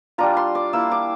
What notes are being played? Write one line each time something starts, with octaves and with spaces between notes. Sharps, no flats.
G3 D4 F4 A#5
C6
D6
A#3 E4 E6
D6